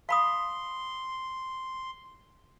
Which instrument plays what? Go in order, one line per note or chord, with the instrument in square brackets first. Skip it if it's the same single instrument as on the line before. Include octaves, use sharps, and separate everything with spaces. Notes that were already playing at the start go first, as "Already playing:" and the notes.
[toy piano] F5 B5 D#6 [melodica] C6